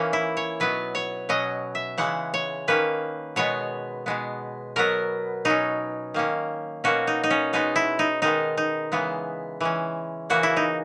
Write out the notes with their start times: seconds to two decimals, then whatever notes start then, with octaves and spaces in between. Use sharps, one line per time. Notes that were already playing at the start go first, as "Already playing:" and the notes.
Already playing: E3 A#3 C#4
0.13 E4
0.37 C#5
0.60 B2 F#3 B3 B4
0.95 C#5
1.29 B2 F#3 C#4 D#5
1.75 E5
1.98 C#3 E3 G#3 F#5
2.34 C#5
2.68 D#3 A#3 C#4 B4
3.36 B2 G#3 B3 C#5
4.06 B2 G#3 B3
4.76 B2 F#3 B3 A#4
5.45 B2 F#3 C#4 D#4
6.14 D#3 A#3 C#4
6.84 B2 A#3 C#4 F#4
7.07 D#4
7.24 D#4
7.30 C#4
7.53 B2 G#3 B3 D#4
7.76 E4
7.99 D#4
8.22 D#3 G#3 B3 D#4
8.57 D#4
8.92 C#3 E3 G#3 B3
9.61 E3 G#3 C#4
10.30 C#3 E3 A#3 F#4
10.43 E4
10.56 D#4